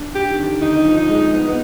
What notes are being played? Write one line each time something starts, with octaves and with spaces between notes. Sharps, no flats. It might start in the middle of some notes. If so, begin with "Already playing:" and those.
Already playing: D4
G4
D#3
D3
D#3 D#4
F3
D#4
G#3
B3 D#4
B3